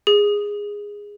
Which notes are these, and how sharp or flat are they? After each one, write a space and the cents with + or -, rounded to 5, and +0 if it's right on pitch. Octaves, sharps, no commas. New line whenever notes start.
G#4 -15